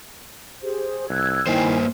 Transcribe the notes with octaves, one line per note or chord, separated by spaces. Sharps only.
G4 G#4 C5
C2 E6 F#6 G#6
G2 D#3 A#3 E4 C5 G5 G#5